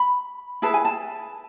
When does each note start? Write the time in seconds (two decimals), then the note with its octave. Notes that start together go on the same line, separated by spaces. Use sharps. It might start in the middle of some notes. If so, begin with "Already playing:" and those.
Already playing: B5
0.62 E4 G#4 B4 A5
0.74 G#5
0.85 A5